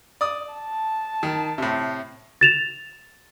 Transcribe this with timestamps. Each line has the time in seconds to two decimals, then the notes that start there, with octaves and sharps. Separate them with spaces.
0.21 D5 D#6
0.54 A5
1.23 D#3
1.58 A2 C3
2.41 A6 E7 F7